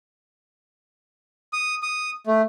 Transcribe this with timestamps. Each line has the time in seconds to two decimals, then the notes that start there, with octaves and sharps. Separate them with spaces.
1.53 D#6
1.82 D#6
2.27 A3